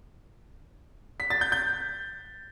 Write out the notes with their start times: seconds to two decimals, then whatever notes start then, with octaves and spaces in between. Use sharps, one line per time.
1.20 B6
1.30 A6
1.41 G6
1.52 G6